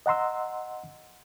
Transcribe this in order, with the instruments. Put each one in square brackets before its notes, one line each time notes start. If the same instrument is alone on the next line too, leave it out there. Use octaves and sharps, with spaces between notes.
[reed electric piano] D#5 F#5 A#5 C6 E6